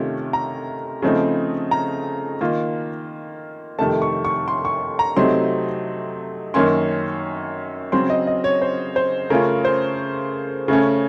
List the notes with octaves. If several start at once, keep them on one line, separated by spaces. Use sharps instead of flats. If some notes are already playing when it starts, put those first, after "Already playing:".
Already playing: C3 D#3 A3 C#4 F4
A#5
C#3 F3 A3 C4 D#4
A#5
D#3 A#3 F4
F2 C3 D#3 A3 A5
C#6
C#6
C6
C#6
A#5
C3 F#3 A3 C4 D#4 C6
F#2 D#3 A#3 C#4 C6
C#3 F#3 C4 C6
D#5
D#5
C#5
C5
C5
C#3 A3 C#4 F4 A#4
C5
C#3 A3 C#4